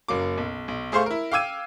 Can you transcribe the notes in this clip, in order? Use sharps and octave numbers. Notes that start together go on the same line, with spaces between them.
F#1 F#3 A#3 D6
B1
B1
A3 G#4 C5 F5 C6 C#6
E4 A#4
F5 G5 D6 E6 G#6 D#7